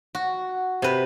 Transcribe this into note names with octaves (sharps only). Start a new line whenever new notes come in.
F#4
C3 B4